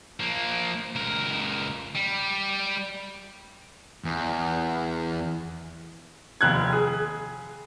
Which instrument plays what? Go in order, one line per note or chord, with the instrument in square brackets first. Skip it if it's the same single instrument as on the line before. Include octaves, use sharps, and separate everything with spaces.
[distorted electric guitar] F3 A#3
C#2 A#4
G3
[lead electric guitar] E2
[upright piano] F1 D#2 F#6 G#6
G#4